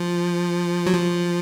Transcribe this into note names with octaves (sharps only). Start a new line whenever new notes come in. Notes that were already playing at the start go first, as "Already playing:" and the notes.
Already playing: F3
F#3
F3